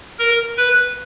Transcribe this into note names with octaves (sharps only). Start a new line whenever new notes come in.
A#4
B4